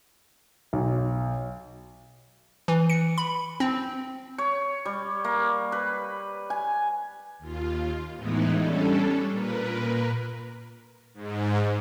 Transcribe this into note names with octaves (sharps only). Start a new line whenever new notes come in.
B1
E3
C#7
B5
C4
C#5
G3
A#3
B4
G#5
D#2 F4
A2 E3 G#3 B3 D#4 E4
G3 C#4 D4 A4
A#2 A#4 B4
G#2